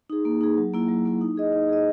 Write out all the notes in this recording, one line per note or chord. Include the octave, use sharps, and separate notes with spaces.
D#4 G#4
A#3
D#4 G#4
F#3
A#3 E4
F#3
A#3 E4
D#4
G#4 D#5
D#4
G#4 D#5